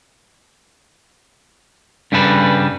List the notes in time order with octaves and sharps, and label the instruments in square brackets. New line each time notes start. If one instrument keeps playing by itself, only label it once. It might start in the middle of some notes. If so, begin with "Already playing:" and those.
[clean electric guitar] G2 C#3 G3 A4 B4